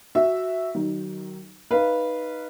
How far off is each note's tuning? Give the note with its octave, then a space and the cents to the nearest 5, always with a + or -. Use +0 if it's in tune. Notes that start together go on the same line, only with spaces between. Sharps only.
F#4 +0 E5 +0
D#3 -10 F#3 +30 D#4 +0
D#4 +0 B4 -10 F5 -20